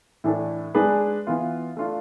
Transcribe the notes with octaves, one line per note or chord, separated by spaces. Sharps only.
A2 E3 A3 D4 A4
G#3 D4 G#4 B4
E3 B3 F4
A3 D4 F4